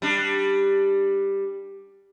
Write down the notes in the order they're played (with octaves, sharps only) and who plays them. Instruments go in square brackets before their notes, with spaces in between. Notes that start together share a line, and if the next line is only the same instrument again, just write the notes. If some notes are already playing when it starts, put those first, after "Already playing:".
[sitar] G3 D4